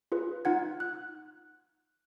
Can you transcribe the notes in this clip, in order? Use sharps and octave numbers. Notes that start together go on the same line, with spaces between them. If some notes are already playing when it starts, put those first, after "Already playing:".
F4 G#4 B4
D#4 F4 F#5 G#6
F#6